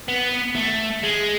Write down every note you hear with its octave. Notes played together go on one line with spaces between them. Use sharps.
B3
A3
G#3